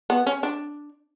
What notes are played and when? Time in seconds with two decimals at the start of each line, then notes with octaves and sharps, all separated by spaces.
0.10 B3
0.27 C#4
0.43 D4